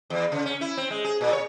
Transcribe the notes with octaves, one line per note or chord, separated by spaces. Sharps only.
E2
C#3
C#4
E4
C4
G#3
G#4
A#2
C#5